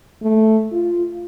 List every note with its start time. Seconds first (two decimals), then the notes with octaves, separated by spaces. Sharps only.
0.22 A3
0.72 F4